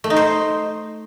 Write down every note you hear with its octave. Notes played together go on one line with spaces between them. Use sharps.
A3
D#4
C5